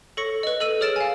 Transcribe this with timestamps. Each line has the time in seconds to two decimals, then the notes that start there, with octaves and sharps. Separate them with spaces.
0.17 A4 C#5 C#6 A#6 C#7
0.43 B4 D#5
0.60 A4 D#5 E6 D#7
0.81 G#4 C#5 F6 A6 D7 E7
0.96 F5 G#5